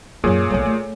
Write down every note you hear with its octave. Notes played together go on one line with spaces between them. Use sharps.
F#2 A#2 F#3 F#4 G#4 C#5
B1 G3 A4 C#5 G#5
A3